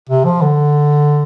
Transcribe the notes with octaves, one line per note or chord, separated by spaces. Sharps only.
C3
F3
D3